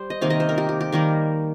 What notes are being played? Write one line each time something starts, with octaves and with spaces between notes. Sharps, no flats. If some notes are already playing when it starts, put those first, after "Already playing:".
Already playing: G3 C5
D#5
C3 D#3 A#3 F5
D#5
C5
A#4
G4
G4
G4
D#3 G3 A#3 A#4